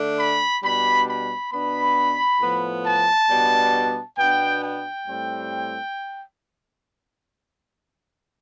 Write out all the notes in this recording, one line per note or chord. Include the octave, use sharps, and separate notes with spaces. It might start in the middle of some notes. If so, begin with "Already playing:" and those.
Already playing: D3 A3 D4
B5
B2 G3 D4 B5
B5
B2 B3 D4 B5
A2 F3 B3
A5
B2 G3 B3 D4
B2 B3 D4 G5
G5
A2 G3 C4